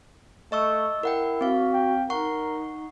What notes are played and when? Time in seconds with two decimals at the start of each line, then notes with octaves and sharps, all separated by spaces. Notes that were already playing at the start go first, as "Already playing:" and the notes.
0.52 A3 D#5 C#6 E6
1.03 E4 A#4 F#5 G5
1.41 C4 F#4 F5
1.73 G5
2.10 D#4 A#4 F#5 C#6